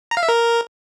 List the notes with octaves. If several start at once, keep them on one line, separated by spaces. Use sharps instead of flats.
A#5
F5
E5
A#4